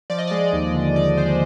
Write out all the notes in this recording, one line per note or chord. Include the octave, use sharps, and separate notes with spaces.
F3 D5
D#5
D5
G#3
D#2
D3
F3 D5
G#3 C5